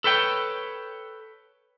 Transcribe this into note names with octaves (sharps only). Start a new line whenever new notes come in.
A4 B4 C#5 G5